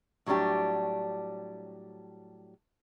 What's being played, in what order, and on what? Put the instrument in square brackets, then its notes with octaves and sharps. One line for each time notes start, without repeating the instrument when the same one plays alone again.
[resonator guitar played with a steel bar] A2 F#3 G3 D4 G4